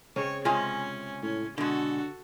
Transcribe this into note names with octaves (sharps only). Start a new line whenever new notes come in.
C#3 C4 C#4 C#5
C3 G#3 C#4 F4 G#5
A2 C#4
B2 D3 G#3 F#4 A4